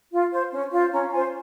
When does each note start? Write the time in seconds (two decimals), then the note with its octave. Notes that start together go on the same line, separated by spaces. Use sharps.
0.12 F4
0.33 C5
0.52 C#4
0.73 F4 C5
0.92 C#4 A#5
1.07 A#5
1.12 F4 G#5
1.15 C5